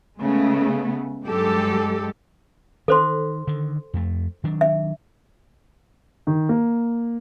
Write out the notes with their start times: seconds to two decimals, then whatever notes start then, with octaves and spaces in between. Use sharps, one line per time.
0.21 C#3 G#3 A3 B3
1.25 G2 F#3 G#3 G4 A4
2.88 D#3 A4 C5 C6
3.47 D3 D#3
3.94 F2 A3
4.44 D#3 F#3 D4
4.61 E5
6.27 D#3
6.49 A#3